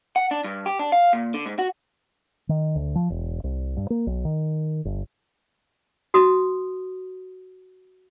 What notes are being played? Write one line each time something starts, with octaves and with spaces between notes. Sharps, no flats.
F#5
D4
G2
G4
D4
F5
A#2
D3
G#2
F#4
D#3
D2
F3
E1
C2
G2
A#3
B1
D#3
G1
F#4 D#6